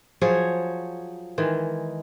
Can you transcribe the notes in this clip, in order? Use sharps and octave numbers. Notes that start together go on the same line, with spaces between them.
F3 F#3 G#4 C#5
D#3 E3 G#3